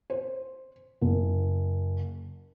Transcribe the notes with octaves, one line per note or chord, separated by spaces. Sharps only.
C5
F#1